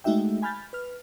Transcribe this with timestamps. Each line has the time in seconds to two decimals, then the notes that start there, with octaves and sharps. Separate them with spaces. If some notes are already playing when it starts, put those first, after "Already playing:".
0.04 G#3 A3 D#4 F#4 E5 G5
0.42 G#5 B5 F6 G6 A6
0.73 B4 F6